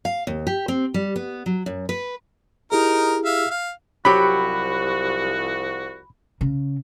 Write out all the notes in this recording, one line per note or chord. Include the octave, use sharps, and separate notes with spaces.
F5
D#2
G4
C4
G3
B3
F#3
F#2
B4
D#4 E4 G4 G#4 A#4
E5 F5
F5
C2 F3 F#3 F#4 G4 B5
C#3